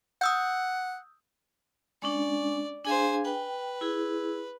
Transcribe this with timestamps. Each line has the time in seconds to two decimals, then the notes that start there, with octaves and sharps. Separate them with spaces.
0.21 F#5 D#6 E6 G6
2.02 G#3 C#4 D4 D5
2.85 D4 G#4 C5 F5 G#5
3.25 B4 G5
3.81 E4 G#4